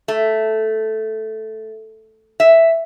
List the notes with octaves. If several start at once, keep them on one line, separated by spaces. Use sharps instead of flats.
A3
E5